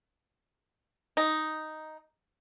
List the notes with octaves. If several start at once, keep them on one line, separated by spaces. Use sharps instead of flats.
D#4